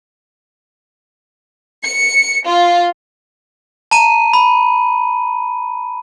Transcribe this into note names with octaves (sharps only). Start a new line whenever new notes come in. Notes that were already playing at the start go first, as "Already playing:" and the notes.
C#7
F4
A5 A#5 D#7
B5